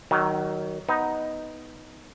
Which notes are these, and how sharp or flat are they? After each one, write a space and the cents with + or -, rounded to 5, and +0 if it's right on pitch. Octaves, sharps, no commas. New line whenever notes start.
D#3 +0 F#3 +25
B3 +0 D#4 +5